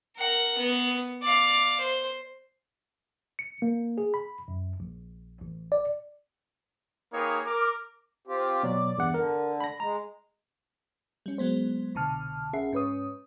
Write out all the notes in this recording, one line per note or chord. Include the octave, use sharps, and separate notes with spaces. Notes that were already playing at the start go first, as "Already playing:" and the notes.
A#4 F#5
B3
D5 F5
C5
C#7
A#3
G#4
B5
F#2
A#1
A1
D5
A#3 D#4 G#4 B4 C#5 G5
A#4 D6
C4 F4 G4
B2 F#3 D5
E2 G2 F#5
D3 A#4
B5 A#6
G#3 A#5
G3 C#4
F#3 G#3 B3 C5
C2 B2 D3 A5 F6
A#1 C#4 G#4 E5 F#5 C7
G#2 C#4 B4 C#5 D#6